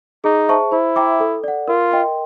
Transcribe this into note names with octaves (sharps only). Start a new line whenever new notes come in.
D#4 G#4
C5 E5 A5 C#6
E4 C5
E5 G5 A#5 D6
A4
D5 F#5
F4 A#4
D#5 G5 C6